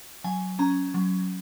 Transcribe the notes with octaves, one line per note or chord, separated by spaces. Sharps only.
F#3 G#5
C#4 A#5
F#3